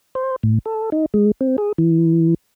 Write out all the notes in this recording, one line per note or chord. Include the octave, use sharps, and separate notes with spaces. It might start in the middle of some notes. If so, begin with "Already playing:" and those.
C5
A2
A4
D#4
G#3
C4
G#4
E3